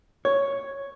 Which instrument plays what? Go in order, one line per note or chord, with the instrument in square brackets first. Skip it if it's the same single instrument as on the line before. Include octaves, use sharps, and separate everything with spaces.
[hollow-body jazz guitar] C#5